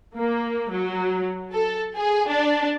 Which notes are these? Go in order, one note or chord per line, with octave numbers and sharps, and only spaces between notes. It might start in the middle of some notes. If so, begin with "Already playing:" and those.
A#3
F#3
A4
G#4
D4